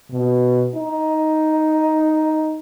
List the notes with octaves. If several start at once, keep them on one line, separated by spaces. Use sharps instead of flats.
B2
D#4